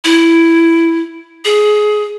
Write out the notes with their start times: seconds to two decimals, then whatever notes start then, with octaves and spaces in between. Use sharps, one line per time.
0.04 E4
1.45 G#4